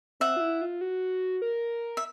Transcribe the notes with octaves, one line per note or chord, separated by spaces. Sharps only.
C4 E5 F#5
F4
E4
F4
F#4
A#4
E5